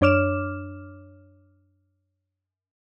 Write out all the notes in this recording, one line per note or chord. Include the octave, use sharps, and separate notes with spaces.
F#2 D4 C#5 D6 F6 E7